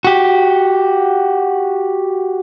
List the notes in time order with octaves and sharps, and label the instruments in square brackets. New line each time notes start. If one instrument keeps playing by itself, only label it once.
[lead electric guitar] F#4 G4